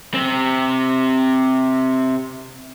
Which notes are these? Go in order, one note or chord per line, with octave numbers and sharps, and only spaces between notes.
C3 C4